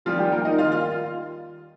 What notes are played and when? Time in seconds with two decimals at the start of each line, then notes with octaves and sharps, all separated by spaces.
0.05 D#2 D#3 F3 G3 F4
0.19 G3 G4
0.32 A#3 A#4
0.45 D#4 D#5
0.58 D#2 D#3 G3 F4 F5
0.72 F4 F5